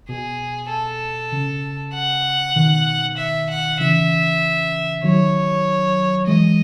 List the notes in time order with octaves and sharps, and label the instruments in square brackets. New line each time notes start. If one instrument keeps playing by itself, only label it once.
[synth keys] B2 [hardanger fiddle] G#4
[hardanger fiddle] A4
[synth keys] C#3
[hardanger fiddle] F#5
[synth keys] B2 D#3
[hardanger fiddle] E5
F#5
[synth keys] C#3 E3 [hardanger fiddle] E5
[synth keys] D#3 F#3 [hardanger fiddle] C#5
[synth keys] E3 G#3 [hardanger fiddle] D#5